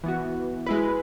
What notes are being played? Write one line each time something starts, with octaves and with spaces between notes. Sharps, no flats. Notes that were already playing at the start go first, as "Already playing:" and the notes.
E3 B3 F#4
G#3 E4 B4